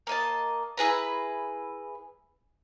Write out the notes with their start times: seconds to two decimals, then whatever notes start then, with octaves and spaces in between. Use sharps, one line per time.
0.07 A#3 D#5 A5
0.77 E4 G#4 B4 A#5